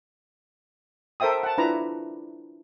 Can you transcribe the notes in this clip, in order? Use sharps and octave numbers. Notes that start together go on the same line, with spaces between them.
A4 A#4 C5 E5 G5 D#6
F#5 A5
D4 E4 F4 B4 A#5